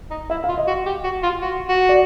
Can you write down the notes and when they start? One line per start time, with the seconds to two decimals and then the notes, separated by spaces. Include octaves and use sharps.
0.10 D#4
0.30 E4 E5
0.44 F5
0.49 F4
0.58 D#5
0.67 F#4
0.86 G4
1.04 F#4
1.23 F4
1.42 F#4
1.69 F#4
1.89 D5